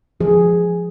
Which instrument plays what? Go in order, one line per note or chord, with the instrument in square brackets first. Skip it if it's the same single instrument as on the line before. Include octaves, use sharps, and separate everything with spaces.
[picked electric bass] F3 [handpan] G#4